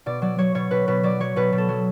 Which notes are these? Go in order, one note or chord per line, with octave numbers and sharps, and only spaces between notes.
B2 D5
F#3 D5
F#3 C#5
B2 C#5
B2 B4
B2 B4
F#3 D5
F#3 C#5
B2 B4
B2
A4
F#3